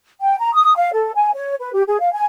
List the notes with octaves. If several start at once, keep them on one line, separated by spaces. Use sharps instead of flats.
G5
A#5
D#6
F5
A4
G#5
C#5
B4
G4
G#4
F5
G#5